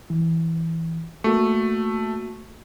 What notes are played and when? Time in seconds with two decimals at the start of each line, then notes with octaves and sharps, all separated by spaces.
0.10 E3
1.24 A3 A#3 F#4 C#6